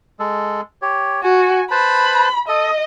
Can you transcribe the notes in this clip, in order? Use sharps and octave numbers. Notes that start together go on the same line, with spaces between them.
G#3 A4
G4 C#5
F#4 G#5
B4 C5 A5 B5
A4 D#5 D#6